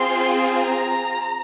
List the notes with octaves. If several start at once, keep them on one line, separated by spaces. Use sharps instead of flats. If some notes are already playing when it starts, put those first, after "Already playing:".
Already playing: C4 F4 G#4 C6
A#5